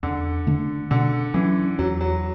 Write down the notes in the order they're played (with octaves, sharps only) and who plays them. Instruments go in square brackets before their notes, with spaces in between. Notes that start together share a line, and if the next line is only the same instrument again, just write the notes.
[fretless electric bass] E2 [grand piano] D3
[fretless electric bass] D3 A3 D4
[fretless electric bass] B2 [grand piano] D3
[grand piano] E3 [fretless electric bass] F#3 C#4
[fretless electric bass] E2 [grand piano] F#3
[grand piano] F#3